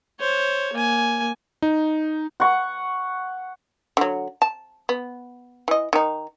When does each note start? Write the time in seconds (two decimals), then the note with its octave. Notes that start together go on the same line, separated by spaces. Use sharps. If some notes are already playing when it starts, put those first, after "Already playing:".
0.20 C5 C#5
0.73 A#3 G#5
1.62 D#4
2.40 F#5 C#6
3.97 D3 F#3
4.42 A5
4.89 B3
5.68 E3 D#5
5.93 D#3 D#4